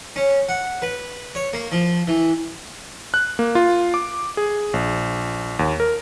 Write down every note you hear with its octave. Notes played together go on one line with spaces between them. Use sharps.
C#4
F#5
B4
C#5
A#3
F3
E3
F#6
A#3
F4
D6
G#4
A#1
D#2
A#4